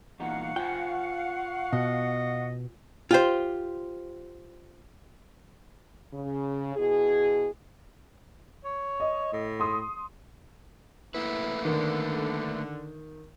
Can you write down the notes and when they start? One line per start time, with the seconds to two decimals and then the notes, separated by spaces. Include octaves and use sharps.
0.20 E2 A#2 D#4 F5 F#5 C#6
0.56 F4 C5 G5 G#5
1.73 B2 D#5
3.11 F4 G4 C5
6.13 C#3
6.76 B2 E4 G#4
8.65 C#5
9.00 D#5
9.33 A2
9.60 C6 D#6
11.15 A3 A#3 E4 B4
11.65 D3 D#3